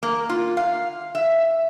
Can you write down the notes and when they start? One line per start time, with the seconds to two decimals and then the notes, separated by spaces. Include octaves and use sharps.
0.03 A#3
0.29 F4
0.57 F5
1.15 E5